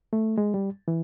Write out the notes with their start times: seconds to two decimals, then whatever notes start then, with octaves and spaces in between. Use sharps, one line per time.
0.13 A3
0.38 G#3
0.54 G3
0.88 E3